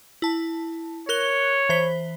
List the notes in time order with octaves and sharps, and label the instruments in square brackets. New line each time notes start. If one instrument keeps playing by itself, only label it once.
[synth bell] E4 A5
[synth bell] A#4 F#6 G7 [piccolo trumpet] C#5
[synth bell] E3 C5 B6